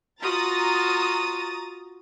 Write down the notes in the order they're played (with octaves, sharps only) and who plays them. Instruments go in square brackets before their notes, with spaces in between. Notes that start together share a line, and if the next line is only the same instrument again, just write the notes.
[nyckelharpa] F4 F#4 [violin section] A#5 D#6 A6